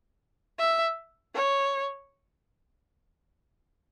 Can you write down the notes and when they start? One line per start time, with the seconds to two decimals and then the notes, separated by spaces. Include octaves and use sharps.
0.59 E5
1.34 C#5